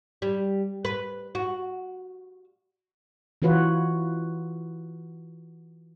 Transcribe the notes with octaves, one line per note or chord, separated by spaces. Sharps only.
G3
B4
F#4
E3 F4 F#4 B4 C#5